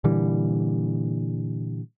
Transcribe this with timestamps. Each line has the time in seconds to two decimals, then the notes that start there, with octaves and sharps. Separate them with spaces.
0.04 A#2 D3 E3 G3